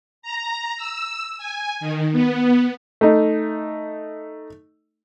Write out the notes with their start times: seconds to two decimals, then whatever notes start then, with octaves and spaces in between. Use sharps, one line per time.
0.22 A#5
0.77 E6
1.38 G#5
1.80 D#3
2.12 B3
3.01 A3 D#4